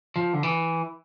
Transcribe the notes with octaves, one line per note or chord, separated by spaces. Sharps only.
F3
D3
E3